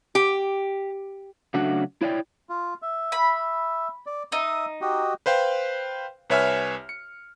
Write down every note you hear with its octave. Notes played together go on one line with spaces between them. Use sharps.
G4
C#3 F#3 A3 D4 F#4 F#5
E4 C#5 D5 G5
F4
E5
B5
D5
D#4 E5 D#6
F#4 G4 D#5
B4 C5 F5 G5
C2 B4 C#5 E5 G#5 F6
C#7